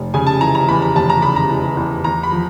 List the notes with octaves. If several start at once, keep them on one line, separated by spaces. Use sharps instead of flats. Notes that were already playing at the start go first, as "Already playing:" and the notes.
Already playing: F1
C#3 G#5
A5
E3 A#5
A#5
E2 B5
A#5
F1 A5
A#5
C#3 B5
A#5
E3
E2
E2 A#5
B5
F3